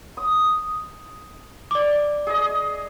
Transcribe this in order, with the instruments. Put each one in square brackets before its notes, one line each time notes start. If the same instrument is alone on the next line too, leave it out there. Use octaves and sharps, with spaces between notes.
[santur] D#6
[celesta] D5 D6
[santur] G#4 D#5